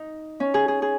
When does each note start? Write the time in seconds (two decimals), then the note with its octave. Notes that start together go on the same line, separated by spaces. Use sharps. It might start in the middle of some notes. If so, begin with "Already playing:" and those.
Already playing: D#4
0.40 C#4
0.54 G#4
0.68 G#4
0.82 G#4